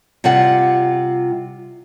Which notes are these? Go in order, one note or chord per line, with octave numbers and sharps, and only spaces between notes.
C3 G3 F4 F#5